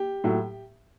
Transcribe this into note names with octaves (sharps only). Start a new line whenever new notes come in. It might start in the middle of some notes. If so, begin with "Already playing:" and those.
Already playing: G4
A2 F#3 A3